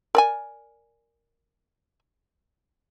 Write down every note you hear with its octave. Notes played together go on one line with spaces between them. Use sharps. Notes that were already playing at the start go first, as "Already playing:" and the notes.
A#4 D5 G#5